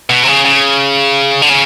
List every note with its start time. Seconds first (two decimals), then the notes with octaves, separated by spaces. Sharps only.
0.10 B2
0.23 C3
0.27 C#3
0.45 C#3
1.42 D3
1.50 C#3